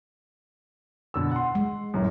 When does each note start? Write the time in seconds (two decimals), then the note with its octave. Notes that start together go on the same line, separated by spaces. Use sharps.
1.14 B2 D3 E6
1.31 F#5 C6
1.55 G#3
1.94 D#1 A1 F#2